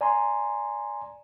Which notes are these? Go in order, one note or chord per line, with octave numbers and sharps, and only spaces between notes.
D5 G#5 A#5 C6